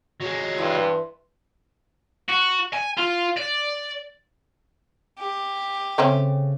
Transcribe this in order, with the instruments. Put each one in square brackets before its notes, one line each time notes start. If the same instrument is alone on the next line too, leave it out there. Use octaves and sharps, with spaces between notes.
[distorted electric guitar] F#3 G#3
[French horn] G2 [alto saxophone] E3 [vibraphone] B4 E5 C6
[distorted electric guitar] F#4
G#5
F4
D5
[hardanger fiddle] G4
[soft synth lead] C#3 [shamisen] A3 C4 C#4